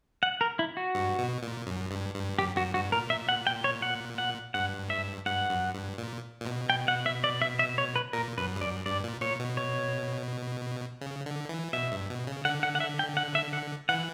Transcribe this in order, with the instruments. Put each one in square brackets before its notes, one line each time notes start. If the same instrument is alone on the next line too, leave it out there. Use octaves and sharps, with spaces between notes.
[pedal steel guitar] F#5
A#4
E4
F#4
[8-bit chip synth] G2
B2
A#2
F#2
G2
G2
[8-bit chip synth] F#2 [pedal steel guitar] G4
[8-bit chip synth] F#2 [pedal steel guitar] F#4
[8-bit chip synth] G2 [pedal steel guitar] F#4
[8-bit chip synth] A#2 [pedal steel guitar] A#4
[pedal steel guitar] E5
F#5
G5
C#5
F#5
F#5
[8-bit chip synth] G2 [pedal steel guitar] F#5
[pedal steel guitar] E5
[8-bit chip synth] G2 [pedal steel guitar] F#5
[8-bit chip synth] F#2
G2
A#2
A#2
B2
[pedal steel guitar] G5
F#5
E5
D5
E5
E5
C#5
B4
[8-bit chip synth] A#2 [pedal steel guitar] A#4
[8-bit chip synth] F#2 [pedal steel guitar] B4
[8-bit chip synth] G2
[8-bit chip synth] F#2 [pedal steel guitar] D5
[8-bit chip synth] G2 [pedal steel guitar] D5
[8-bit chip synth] A#2
[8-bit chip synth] A#2 [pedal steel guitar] C#5
[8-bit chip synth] B2
[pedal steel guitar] C#5
[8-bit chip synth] C#3
D3
E3
[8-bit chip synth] B2 [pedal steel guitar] E5
[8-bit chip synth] G2
B2
C#3
[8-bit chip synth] D3 [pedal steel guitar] F#5
[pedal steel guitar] F#5
F#5
E5
G5
F#5
E5
F#5
[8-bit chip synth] E3 [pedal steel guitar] F#5